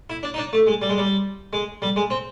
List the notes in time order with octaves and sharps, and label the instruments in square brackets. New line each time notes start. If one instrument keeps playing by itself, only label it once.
[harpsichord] E4
D4
D#4
D4
A3
G#3
G3
G#3
G3
G#3
G3
G#3
C4